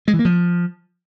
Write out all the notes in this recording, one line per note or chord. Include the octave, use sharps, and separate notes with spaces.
G#3
E3
A#3
F3